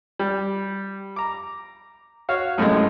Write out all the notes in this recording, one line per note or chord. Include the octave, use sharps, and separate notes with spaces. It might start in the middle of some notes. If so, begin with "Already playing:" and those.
G3
A#5 D6
F#4 C#5 F5
F#2 A2 C3 G#3